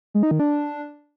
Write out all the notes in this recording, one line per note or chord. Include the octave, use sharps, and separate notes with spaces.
G#3
D#4
D#3
D4